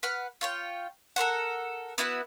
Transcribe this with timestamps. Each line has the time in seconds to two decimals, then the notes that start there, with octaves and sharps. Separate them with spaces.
0.03 B4 F#5 F6
0.41 F4 C#5 G5
1.16 A4 A#4 C5 F#5
1.98 B3 E4 F#4 B4